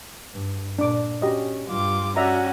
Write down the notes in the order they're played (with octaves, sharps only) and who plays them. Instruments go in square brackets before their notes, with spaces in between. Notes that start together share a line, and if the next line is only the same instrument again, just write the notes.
[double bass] G2
[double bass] A#2 [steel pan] D4 D6
[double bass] C#4 [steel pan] F#4 G4 D#5
[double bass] G2 G3 [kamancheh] F4 D6
[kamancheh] C#4 F#4 [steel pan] D5 E5 A#5